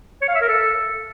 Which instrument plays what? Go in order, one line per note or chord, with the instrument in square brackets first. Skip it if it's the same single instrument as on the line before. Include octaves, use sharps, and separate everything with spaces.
[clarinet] C#5
F5
E5
A#4
A4